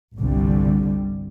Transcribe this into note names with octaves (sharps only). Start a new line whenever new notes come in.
G1 C2 D3 G3